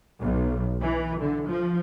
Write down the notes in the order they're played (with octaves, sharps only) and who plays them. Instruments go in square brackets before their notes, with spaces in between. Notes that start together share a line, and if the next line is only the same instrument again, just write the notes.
[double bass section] B1
E3
D3
F3